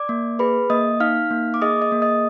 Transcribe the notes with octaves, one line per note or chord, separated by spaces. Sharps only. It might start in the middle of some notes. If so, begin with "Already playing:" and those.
Already playing: D5 D6
A#3
G#4 B4 B5
A#3 D#5 D#6
D#4 F5 F6
A#3
D6
G#4 D#5 D#6
D#5 D#6
A#3
D#5 D#6